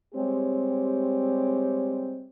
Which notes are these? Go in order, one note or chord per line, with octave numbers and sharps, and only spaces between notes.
G3 G#3 C4 G4 C#5